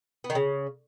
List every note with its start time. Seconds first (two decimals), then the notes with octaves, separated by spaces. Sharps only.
0.24 B3
0.30 D#3
0.35 C#3